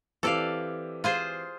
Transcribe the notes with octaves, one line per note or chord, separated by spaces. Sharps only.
E3 C4 G4 A4 D5 F5
F4 G#4 C5